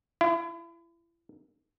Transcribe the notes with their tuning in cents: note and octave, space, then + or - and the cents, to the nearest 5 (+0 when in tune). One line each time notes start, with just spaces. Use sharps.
E4 +35